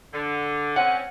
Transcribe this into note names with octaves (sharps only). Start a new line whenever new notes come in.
D3
C4 C#4 F#5